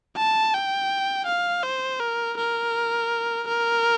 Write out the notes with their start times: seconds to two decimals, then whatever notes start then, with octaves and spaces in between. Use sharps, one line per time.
0.17 A5
0.54 G5
1.27 F5
1.64 C5
2.00 A#4
2.38 A#4
3.48 A#4